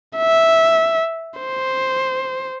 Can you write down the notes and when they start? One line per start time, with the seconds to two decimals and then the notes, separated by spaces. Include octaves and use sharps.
0.17 E5
1.40 C5